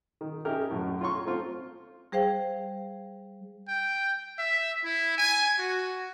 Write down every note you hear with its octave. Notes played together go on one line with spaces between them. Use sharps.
D#3
C#4 D#4 E4 G4 G#4 A#4
F#2 A2
F4 C#5 A#5 C6 C#6
A3 C4 F4
G3 G#4 C5 F5 G5
G5
E5
E4
G#5
F#4